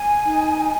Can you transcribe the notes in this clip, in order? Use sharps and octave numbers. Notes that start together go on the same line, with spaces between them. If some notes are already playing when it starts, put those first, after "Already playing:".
Already playing: G#5
D#4